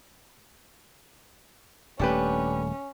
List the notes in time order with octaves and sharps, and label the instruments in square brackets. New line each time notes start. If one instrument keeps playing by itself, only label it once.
[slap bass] D#1 A3 [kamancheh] C#4 [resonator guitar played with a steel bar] D4 G4 B4